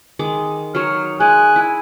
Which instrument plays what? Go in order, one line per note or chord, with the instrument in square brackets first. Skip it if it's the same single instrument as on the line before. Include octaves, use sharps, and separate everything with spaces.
[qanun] D#3 G#3 D6
[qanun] F#3 D#4 C#5 [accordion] F6
[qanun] G#3 [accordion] G#5 F#6
[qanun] E4